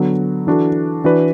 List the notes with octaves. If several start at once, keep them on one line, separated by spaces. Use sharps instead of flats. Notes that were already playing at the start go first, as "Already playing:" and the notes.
Already playing: D3 F#3 B3 F#4 A4
E3 D4 F#4 A4
E3 D4 F#4 B4 D5